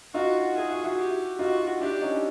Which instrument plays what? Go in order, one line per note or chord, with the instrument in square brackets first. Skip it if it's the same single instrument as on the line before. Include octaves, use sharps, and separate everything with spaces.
[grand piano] D#4 F4 [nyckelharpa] F#4
[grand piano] E4 F#4 [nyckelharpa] G#4
[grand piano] E4 F#4
E4 F#4
[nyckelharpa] G4
[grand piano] D#4 F4 [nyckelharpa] F#4
[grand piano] D4 E4 [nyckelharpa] G4
[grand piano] C#4 D#4